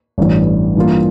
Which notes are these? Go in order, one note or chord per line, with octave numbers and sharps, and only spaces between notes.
A1 G2 E3
G2 E3 A#3 F4